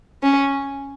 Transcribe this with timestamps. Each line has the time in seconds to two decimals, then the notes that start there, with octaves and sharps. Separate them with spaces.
0.23 C#4